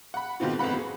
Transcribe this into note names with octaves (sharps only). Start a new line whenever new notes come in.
F#5 B5
G#2 B2 D#3 C4 F4
G1 F2 B3 F#5 B5
F#4 G#4